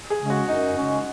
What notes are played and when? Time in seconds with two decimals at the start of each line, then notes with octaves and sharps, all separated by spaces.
0.10 G#4
0.20 C#3 G#3 C#4
0.30 F#4
0.48 F#2 D#4
0.77 C#3 G#3 C#4